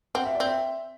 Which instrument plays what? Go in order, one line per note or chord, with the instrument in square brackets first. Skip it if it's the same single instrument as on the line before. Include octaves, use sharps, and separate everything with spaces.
[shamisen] C4 [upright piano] F#5
[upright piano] E5
D5
[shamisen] C4 [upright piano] E5